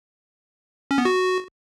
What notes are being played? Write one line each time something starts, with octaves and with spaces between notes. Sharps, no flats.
C#4
B3
F#4